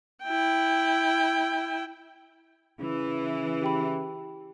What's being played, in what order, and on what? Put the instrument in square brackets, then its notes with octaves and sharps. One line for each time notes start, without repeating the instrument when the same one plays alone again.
[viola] E4 G5
[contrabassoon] C#3 [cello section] E3
[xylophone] G4 G5 B5